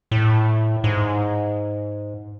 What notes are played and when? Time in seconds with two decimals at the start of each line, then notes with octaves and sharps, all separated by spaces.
0.11 A2
0.84 G#2